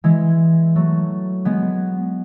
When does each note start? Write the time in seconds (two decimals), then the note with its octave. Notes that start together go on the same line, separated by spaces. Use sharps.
0.04 E3 G#3
0.76 F#3 A3
1.45 G#3 B3